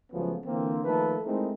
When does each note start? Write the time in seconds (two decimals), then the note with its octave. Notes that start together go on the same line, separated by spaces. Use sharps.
0.13 C#2 F3 F#3 A3 B3 C#4
0.45 D3 E3 A#3 C4
0.84 D#3 F3 A3 A#3 A4 B4
1.24 G#3 A3 C4 D#4 E4 A#4